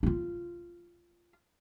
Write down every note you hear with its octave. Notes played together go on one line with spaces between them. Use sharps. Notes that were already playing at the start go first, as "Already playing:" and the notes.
E4 F4